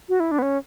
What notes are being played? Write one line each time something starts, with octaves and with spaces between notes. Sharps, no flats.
F#4
E4
D4
B3
C#4